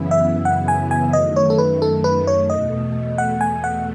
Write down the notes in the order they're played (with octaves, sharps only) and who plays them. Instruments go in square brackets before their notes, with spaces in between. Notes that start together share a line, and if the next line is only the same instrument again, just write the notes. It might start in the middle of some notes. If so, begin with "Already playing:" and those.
Already playing: [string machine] F#2 C#3 E3 B3 E4
[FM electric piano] E5
F#5
G#5
G#5
[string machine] F#2 D#3 A3 [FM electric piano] D#5
[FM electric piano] C#5
A4
B4
A4
B4
C#5
[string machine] E2 B2 A3 [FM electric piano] D#5
[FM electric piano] F#5
G#5
F#5